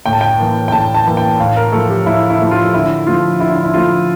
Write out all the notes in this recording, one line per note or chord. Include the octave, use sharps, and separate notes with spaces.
A2 G5
A5
G5
E3 A#3
G5
A2 A5
A5
E3 A#3
G5
A2 F5
A#4
F3 A3 A4
G4
A2 E4
E4
F3 A3
F4
D3 E4
F3 A3 F4
D3 E4
E4
F3 A3 F4